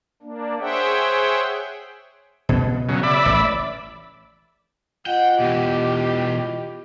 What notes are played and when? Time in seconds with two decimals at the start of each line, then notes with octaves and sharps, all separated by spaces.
0.22 A#3 D4
0.60 G#4 C5 C#5 E5 F#5 G5
2.49 B2 B3
2.89 C#3 F#3
3.03 D5 E5 B5
3.26 A1
5.06 F4 D#5 F#5 G5
5.40 B2 E3 G4